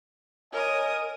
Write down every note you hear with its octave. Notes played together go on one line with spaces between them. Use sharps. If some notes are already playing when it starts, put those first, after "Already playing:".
A#4 C#5 D#5 G#5 D#6